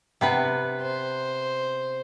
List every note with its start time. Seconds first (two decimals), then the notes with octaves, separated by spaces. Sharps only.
0.21 C3 B3 B4
0.81 C5